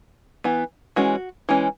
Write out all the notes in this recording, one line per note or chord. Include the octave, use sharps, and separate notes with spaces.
E3 B3
E3 G#3 C#4 F#4
E3 G#3 C#4